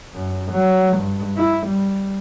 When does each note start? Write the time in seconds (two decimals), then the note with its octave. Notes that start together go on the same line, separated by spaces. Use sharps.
0.15 F#2
0.52 F#3
0.98 G2
1.37 E4
1.67 G3